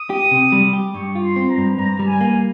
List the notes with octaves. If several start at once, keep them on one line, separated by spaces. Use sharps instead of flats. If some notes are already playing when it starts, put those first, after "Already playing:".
Already playing: D#6
G4
C3
G3
G4
G2 C#6
F4
C6
C4
A#5
G2
G2 A#5
G3
G#5
A#3